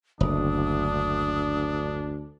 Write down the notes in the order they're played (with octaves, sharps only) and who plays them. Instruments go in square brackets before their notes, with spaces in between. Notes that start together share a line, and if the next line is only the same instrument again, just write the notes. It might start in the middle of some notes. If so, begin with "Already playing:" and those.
[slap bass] F#1 [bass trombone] D2 [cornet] D4 [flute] D#6